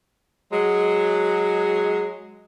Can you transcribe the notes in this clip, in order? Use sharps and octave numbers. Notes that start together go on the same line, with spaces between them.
F#3 G#3